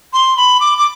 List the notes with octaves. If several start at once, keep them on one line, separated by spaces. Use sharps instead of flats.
C6
B5
D6
D6